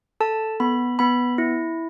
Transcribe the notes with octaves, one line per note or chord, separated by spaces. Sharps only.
A4 A5
B3 B5
B3 B5
E4